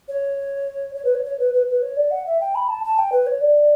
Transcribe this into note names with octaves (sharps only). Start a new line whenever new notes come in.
C#5
C#5
B4
C#5
C#5
B4
B4
B4
C#5
D5
F#5
E5
G5
B5
A5
A5
G5
B4
C#5
D5